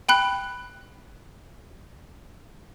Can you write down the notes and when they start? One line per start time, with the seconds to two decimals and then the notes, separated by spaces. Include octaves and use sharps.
0.09 G5 B5 F#6